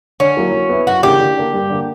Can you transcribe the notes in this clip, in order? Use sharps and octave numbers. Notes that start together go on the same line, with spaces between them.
D3 C#4
F#3 A#3 E4
F#3
B3 E4
F#2 F#4
C#3 E3 A#3 D4 G4
D3
A#3 D4
G2
D3 A#3